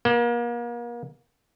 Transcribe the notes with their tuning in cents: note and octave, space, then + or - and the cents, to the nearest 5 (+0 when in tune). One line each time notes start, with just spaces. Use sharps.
A#3 +35